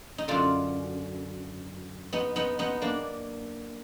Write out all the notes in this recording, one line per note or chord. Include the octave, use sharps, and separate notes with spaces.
D#4
F#2 D3 D4 F4
B3 D#4
B3 D#4
B3 D#4
A#3 D4